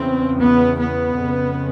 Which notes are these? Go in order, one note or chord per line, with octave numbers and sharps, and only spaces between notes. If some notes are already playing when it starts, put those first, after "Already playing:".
Already playing: E2 C#3 C4
B3
B3
F2 C#3